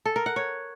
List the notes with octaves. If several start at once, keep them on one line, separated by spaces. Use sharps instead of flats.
A4
A#4
F#5
C#5